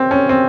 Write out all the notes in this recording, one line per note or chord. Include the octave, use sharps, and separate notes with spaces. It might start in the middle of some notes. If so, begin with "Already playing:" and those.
Already playing: C4
C#4
C4